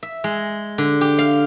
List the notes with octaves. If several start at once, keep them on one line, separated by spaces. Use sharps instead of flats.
E5
G#3
D3
G4
F5